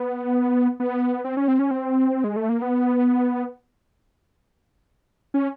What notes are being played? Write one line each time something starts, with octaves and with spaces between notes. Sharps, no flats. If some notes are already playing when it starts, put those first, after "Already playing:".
Already playing: B3
B3
C4
C#4
C4
C#4
C4
G#3
A3
A#3
B3
C#4